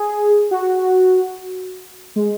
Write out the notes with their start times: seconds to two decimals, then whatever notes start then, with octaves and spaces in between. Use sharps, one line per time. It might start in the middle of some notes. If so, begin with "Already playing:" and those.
Already playing: G#4
0.51 F#4
2.16 G#3